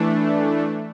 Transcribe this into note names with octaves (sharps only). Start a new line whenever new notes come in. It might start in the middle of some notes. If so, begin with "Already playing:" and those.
Already playing: E3 A3 D4